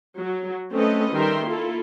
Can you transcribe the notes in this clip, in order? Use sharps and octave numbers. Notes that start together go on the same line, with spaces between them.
F#3
A3 C4 C#4 A4 B4 D#5
D#3 G3 A#4 E5 G5 C6
A#3 E4 F4 A4